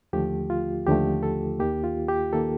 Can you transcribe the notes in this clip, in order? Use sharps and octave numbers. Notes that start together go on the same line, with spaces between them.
D#2 D3 F3 A3 G4
F4
D#2 D3 F3 A3 G4
A4
D#2 D#3 A#3 G4
F4
G4
D#3 A#3 A4